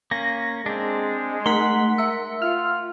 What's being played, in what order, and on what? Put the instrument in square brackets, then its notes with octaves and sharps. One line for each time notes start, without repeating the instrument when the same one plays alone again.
[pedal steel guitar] A#3 C#4 [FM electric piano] A#6
[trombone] G#3 [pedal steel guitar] C4 D4
[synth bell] A3 [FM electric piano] A#4 B6 [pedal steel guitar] F#5 C6
[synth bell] E5 E6
[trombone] F4 [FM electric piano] F6